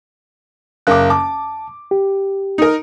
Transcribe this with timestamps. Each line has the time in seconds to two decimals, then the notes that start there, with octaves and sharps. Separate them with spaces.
0.87 F#1 A#4 F5 D6 F#6
1.10 A5 D6
1.91 G4
2.58 D#4 A#4